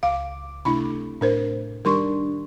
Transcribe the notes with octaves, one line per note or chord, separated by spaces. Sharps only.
C#2 F5 D6
C3 A3 D4 E4 B5
A2 D4 A#4 C5
D#3 G3 D4 A#4 C6 C#6